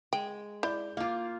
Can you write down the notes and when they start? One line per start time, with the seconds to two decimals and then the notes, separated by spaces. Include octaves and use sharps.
0.13 G#3 G5
0.63 E4 D5 G6
0.97 A#3 F4 F5 D6